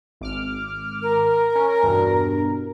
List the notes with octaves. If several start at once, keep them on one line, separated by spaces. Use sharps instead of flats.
G#1 D6 F6
A#4
C#4
E2 G2 B2